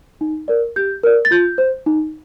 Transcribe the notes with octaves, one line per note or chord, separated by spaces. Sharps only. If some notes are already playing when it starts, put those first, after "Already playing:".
D#4
A#4 D5
G4 G6
A#4 D5
A6
F4 G6
C5
D#4